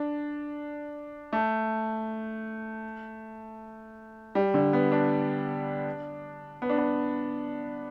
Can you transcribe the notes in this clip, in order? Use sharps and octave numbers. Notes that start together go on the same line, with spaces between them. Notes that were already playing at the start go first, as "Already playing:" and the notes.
Already playing: D4
A3
G3
D3
B3
D4
B3
D4
B3